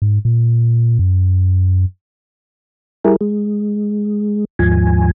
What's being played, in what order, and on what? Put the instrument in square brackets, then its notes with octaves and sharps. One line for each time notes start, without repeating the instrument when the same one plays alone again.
[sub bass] G#2
A#2
F#2
[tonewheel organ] G3 E4 G#4 A#4
G#3
D#2 G#2 F3 G#5